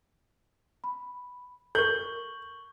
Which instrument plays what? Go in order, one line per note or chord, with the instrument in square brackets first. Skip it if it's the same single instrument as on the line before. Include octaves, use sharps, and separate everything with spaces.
[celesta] B5
[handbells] A4 A#4 [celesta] C#6 F#7 [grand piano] G6